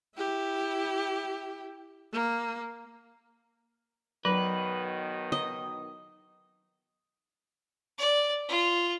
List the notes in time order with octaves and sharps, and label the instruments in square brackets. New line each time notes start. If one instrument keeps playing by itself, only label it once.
[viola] E4 G4
A#3
[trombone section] B1 B2 D#3 [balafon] F#3 [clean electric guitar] B4
[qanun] D#5
[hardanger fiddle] D5
F4